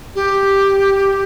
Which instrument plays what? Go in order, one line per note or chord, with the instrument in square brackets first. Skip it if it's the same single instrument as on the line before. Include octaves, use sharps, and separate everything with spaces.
[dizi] G4